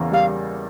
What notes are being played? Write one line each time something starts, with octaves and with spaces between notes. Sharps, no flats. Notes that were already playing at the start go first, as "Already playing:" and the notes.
Already playing: E2 C#3 A#3
G3 F5